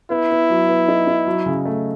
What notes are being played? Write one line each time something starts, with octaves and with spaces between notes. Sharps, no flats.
B3 E4
B3
F#3
B3
D#4
D#4
F#3
C#3
A3